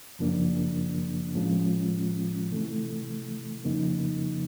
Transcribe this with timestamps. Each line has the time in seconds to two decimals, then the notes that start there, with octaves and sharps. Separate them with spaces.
0.19 F#2 C#3 F3 A#3 D4
1.35 A2 F3 G#3 C#4 F4
2.50 C3 E3 A3
3.64 F2 C#3 F3 A#3 D#4